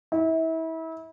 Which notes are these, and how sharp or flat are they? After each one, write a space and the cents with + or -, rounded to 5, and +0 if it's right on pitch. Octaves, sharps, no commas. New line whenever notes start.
E4 -30